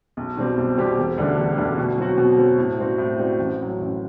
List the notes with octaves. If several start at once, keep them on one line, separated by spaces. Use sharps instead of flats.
B1
B2 G3 C4 G4
B1
B2 G3 C4 G4
E1
D2 D3 G3 D4
E1
D2 D3 G3 D4
B2
F#3 C4 F#4
B2
F#3 C4 F#4
A2
G3 C4 F#4
A2
G3 C4 F#4
A1
A2 F#3
A1